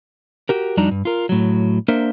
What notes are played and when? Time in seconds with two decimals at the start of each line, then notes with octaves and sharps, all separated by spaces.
0.49 F#4 G4 A#4
0.77 F2 G3 D4 D#4 F#4 A#5
0.91 G2
1.05 F4 A#4
1.29 A2 F#3
1.88 A#3 D4 A#4 C5 E5